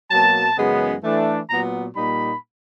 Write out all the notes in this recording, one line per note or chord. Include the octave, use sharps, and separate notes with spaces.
B2 F#3 A#3 A5
F#2 C#3 E3 G#3 B3
E3 A3 D4
A#2 F#3 B3 A#5
A#2 G3 A#3 D#4 B5